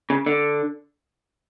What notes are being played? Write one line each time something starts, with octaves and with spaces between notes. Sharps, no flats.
C#3
D3